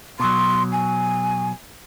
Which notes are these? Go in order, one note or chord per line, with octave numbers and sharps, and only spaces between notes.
B2 F#3 C6
G#5